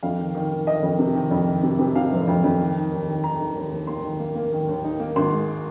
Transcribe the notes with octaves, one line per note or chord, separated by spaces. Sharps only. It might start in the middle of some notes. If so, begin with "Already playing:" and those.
F2 F5
D#3
D#3
D#3
D#3 D#5
F2
C3
D#3
F2
D#3
C3
C3
C3 F5
F1
F2
F2
D#3
D#4
D#2
D#3
D#3 A#5
D#4
D#2
D#2
A#3 C6
D#3
A#3
A#3
D#3
D#2
D#4
A#3
G#1 C6
G#3